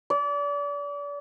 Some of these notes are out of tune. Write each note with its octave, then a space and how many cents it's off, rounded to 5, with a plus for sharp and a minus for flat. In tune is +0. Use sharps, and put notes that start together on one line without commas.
D5 -35